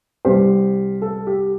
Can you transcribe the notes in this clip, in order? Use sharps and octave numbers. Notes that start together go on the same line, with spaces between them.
C2 C3 G3 G4 C5
A4
G4